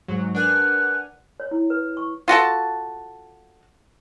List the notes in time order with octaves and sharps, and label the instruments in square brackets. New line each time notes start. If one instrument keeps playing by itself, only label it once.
[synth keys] G#2 F#3
[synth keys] D4 G#5 F6 [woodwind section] A#4 B4 F#5
[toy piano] C#5
E4
B4
C#6
[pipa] F4 F#4 A4 A5